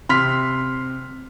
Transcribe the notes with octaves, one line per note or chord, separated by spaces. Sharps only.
C3 C6 F6 B6